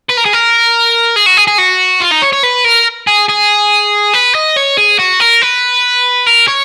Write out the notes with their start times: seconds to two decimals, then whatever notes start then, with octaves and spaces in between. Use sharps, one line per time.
0.09 B4
0.17 A#4
0.25 G#4
0.33 A#4
1.16 G#4
1.26 F#4
1.37 G#4
1.48 G#4
1.58 F#4
2.01 F4
2.12 D#4
2.22 C#5
2.33 C#5
2.44 B4
2.65 A#4
3.07 G#4
3.29 G#4
4.14 B4
4.35 D#5
4.57 C#5
4.77 G#4
4.99 F#4
5.20 A#4
5.42 B4
6.26 A#4
6.48 C#5